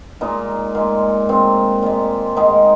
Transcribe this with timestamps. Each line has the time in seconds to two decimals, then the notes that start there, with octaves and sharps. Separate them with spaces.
0.21 A#2 G#3 D#4
0.75 A#2 G#3
1.29 A#2 G#3 C4
1.83 A#2 G#3
2.36 G#2 D#3 G#3 D#4